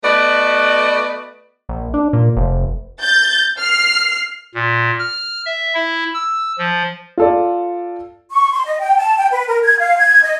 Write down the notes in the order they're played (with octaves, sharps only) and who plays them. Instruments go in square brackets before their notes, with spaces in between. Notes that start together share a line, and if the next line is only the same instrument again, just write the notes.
[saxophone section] A3 B3 F#4 B4 D5 D#5
[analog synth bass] A#1
D4
A#2
F1
[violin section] G6 A6
F6 C7
[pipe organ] A#2
F6
E5
E4
E6
F3
[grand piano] F4 A4 D5
[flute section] C#6
C6
D#5
G5
A5
G5
B4
A#4
G#6
F5
G#6
D#5